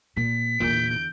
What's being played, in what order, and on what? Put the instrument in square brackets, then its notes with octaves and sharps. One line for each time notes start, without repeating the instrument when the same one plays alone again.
[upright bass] A#2 [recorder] B6
[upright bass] E2 D3 [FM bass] A#2 [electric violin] G6 D7